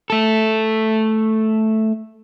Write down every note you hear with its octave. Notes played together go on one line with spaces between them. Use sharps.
A3 A4